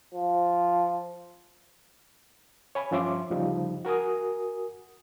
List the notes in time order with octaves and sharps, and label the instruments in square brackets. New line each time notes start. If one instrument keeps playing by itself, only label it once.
[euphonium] F3
[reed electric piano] C#5 G#5 B5
G2 F3 C#4 E5 C6 D6
D2 C#3 F3 G3 D#4
F#4 A#4 G#5 D#6